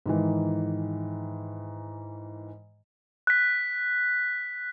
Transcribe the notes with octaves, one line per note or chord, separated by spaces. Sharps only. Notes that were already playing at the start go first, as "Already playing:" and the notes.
G#2 D#3 E3
F#6 B6